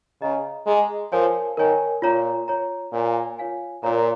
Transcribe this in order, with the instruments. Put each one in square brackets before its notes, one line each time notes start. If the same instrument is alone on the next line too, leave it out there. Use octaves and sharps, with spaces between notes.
[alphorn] C#3 [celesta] G#4 D#5 A#5
[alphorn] G#3 [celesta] G#4 D#5 A#5
[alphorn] F3 [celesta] A#4 C#5 G#5
[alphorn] D#3 [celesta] A#4 C#5 G#5
[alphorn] A#2 [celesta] F4 C#5 A#5
[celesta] F4 C#5 A#5
[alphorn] A#2 [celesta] F4 C#5 F5 G#5
[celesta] F4 C#5 F5 G#5
[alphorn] A#2 [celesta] F4 A#4 C#5 A#5